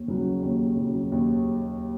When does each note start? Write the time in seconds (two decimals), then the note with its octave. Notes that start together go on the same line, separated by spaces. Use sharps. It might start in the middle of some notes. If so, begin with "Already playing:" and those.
Already playing: D#2
0.08 C#3 F#3
0.42 D#2
0.77 C#3 F#3
1.12 D#2